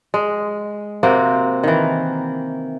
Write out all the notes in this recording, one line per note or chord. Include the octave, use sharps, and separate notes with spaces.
G#3
C3 A#3 C4 F#4
D#3 E3